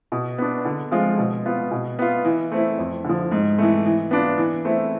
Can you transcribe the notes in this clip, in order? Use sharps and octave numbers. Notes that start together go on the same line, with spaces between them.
B2
B3 D4
D3
F3 G#3 C4 F4
B2
B3 F4
B2
B3 F4
E3
A3 C4 E4
F2
D3 F3
G#2
E3 A3
E3
B3 D4 F4
E3
A3 C4 E4